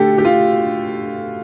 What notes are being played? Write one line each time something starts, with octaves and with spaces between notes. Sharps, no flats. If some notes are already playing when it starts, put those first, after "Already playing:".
Already playing: D3 A3 G4 A4
G4
F4